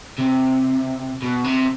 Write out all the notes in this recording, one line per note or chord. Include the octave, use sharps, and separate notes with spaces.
C3
B2
C3